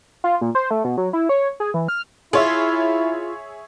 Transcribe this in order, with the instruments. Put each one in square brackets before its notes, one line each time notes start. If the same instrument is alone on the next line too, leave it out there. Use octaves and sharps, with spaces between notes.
[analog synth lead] F4
A#2
C5
A3
B2
F#3
E4
C#5
G#4
E3
F6
[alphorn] E4 [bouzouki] F4 [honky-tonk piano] G#4 C#5 E5